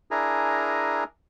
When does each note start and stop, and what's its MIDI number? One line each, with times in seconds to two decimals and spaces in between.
0.11 1.04 62
0.11 1.04 64
0.11 1.04 68
0.11 1.04 70
0.11 1.04 80
0.11 1.04 82